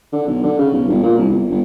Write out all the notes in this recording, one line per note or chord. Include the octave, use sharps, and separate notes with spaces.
D3
B1
D3
C#3
B1
G1
A#2
C2
G1
G1